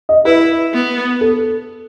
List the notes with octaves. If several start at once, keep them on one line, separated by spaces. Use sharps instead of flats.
D#5
E4 B4
B3
A4